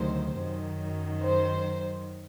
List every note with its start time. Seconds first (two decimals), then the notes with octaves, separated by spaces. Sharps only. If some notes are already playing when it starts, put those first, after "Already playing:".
Already playing: D2 C3 D#3 F#3 C5
0.40 F#2 D#3 F#3
1.23 C5